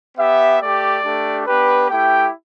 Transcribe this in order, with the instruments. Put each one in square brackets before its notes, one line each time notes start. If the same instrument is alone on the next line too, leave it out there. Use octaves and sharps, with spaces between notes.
[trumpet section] B3 G4 E5
A3 G4 D5
A3 D4 G4
B3 D4 G4 B4
A3 E4 G4 G5